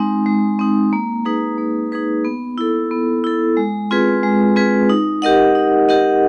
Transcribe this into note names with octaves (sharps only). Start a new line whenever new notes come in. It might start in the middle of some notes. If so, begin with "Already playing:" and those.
Already playing: G#3 C4 D#4
G#3
C4 D#4
A#3
D#4 G#4 B4
A#3
D#4 G#4 B4
B3
E4 A4
B3
E4 A4
G#3
C4 F4 G#4 B4
G#3
C4 F4 G#4 B4
D#4
G4 A#4 D#5 F#5
D#4
G4 A#4 D#5 F#5